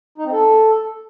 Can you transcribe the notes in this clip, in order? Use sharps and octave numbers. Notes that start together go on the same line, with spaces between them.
D#4
C4
A4